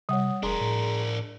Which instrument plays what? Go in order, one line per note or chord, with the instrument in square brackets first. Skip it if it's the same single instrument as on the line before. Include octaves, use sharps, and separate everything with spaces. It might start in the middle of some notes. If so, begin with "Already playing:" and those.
[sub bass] C3 [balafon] G3 [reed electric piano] C#5 F#5 D#6
[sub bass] E1 [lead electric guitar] D4 A#4 [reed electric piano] G#4 A#5 C6
[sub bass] A2